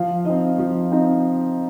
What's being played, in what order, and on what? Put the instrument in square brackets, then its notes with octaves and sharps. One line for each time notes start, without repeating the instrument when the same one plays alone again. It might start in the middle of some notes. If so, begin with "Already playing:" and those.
Already playing: [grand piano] F3 F5
C4 D#4 D#5
F3
C4 D#4